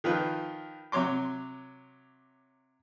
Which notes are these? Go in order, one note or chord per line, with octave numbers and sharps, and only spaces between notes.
D#3 F3 F4 B4
C3 F#3 C#5 C6 D6